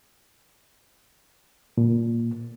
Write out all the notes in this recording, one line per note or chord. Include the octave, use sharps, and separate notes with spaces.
A#2